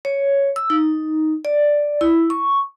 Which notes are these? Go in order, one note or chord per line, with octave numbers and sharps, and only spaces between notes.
C#5
E6
D#4
D5
E4
C#6